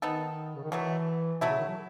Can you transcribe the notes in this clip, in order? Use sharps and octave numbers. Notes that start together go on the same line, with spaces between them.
D#3 B3 D#4 A4
C#3
D#3
B2 E3 F#3 A3
B2 F#3 A3 E4
C#3
D#3
F#3